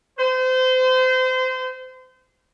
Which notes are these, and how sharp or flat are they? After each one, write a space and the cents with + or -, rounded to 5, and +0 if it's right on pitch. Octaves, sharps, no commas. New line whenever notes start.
C5 -30